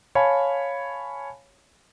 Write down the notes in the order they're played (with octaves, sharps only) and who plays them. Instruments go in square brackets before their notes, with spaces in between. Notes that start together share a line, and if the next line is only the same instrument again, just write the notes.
[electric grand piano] C#5 F5 G#5 A5 B5